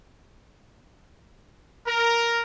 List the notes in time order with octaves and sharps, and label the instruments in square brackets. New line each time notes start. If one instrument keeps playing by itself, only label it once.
[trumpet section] A#4